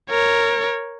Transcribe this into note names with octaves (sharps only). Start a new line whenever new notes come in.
A#4 C#5